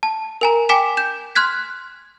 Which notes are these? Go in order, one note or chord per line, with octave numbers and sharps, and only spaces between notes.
A5
A#4 G#5 A#5
G5 G#5 D6 B6 E7
G6 E7
C6 F6 F#6 G#6 B6